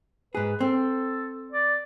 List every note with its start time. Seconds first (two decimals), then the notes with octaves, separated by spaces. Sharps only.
0.35 G#2 G#4 B4
0.60 C4 A4
1.53 D5